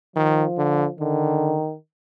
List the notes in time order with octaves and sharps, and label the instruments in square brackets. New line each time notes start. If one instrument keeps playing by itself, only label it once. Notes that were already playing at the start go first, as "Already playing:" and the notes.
[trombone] D#3 [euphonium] F3
[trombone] D3
[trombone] D3 [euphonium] D#3